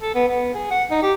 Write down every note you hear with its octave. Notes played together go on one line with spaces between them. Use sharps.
A4
B3
B3
G#4
F#5
D#4
G4